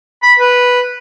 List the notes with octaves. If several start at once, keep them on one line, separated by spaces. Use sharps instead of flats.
B5
B4